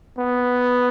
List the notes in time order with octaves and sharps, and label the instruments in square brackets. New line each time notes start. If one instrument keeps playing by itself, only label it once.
[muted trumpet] B3